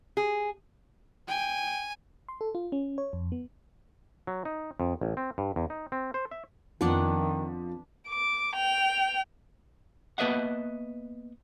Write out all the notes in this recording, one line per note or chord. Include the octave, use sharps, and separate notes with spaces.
G#4
G5 G#5
C6
A4
F4
C#4
C#5
F2
B3
F#3
D#4
F2
A1
C4
G2
E2
D#4
C4
C5
E5
F2 D#3 F3 B3 D4 F#5
D6
G5 F7
A#3 B3 B4 D#5 E5 F#5